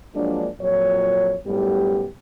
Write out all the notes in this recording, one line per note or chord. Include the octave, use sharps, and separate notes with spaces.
F3 F#3 G#3 A#3 D4
F2 A#2 F#3 C#5
F#2 A2 G3 B3 G4